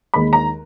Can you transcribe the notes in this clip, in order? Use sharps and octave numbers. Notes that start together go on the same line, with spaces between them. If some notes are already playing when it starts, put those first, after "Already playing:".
D#2 D#3 G#3 B5
A#5